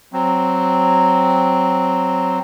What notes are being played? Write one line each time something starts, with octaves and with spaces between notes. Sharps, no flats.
F#3 C4